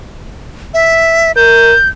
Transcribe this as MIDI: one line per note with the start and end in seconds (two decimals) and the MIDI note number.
0.74 1.32 76
1.36 1.74 70
1.36 1.88 91